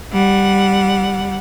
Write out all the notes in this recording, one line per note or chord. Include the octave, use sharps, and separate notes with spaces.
G3 F#5